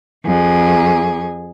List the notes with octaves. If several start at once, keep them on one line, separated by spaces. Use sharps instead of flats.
F2 G#4